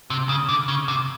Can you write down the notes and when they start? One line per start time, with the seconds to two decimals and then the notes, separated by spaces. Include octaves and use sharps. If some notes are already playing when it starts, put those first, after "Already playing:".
0.10 C3
0.29 C#3
0.49 D3
0.68 C#3
0.88 C3